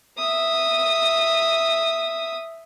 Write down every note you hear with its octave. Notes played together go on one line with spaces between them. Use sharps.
E5 D#6